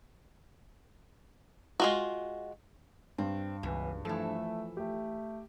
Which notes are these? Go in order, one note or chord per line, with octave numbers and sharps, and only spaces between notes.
G#3 F4 F#4
G2 C4
C#2 B2 E3
E3 F3 A3 A4
A3 G4